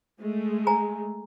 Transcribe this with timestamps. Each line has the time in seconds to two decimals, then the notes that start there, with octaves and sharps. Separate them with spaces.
0.21 G#3 A3
0.67 G#5 A#5